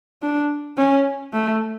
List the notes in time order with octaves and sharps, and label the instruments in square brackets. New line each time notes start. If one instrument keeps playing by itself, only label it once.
[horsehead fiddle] D4
C#4
A3